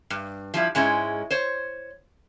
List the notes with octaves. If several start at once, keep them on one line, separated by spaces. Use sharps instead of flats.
G2
F3 G3 E4
G#2 G#3 C#4 E4
C5 C#5